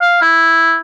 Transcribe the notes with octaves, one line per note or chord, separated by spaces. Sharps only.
F5
E4